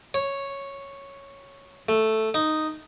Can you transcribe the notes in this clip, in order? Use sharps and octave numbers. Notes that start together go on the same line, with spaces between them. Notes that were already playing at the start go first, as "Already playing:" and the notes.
C#5
A3
D#4